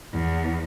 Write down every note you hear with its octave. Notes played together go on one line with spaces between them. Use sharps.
E2